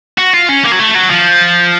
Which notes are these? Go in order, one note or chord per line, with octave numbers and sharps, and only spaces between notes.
F#4
F4
C#4
A#3
F#3
A3
F#3
F3